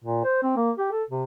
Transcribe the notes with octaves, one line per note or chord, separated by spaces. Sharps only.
A#2
C5
C4
A#3
G4
A4
C3